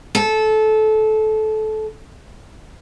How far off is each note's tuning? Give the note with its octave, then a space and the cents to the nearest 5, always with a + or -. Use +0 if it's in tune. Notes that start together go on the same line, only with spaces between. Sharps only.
A4 -20